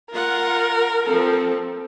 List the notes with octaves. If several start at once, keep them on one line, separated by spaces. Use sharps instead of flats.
F4 A#4 F#5
F3 C4 A4